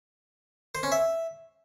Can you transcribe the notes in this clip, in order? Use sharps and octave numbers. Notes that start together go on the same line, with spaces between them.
C5
C#4
E5